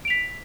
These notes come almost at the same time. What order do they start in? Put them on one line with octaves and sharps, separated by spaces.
D7 F7 B6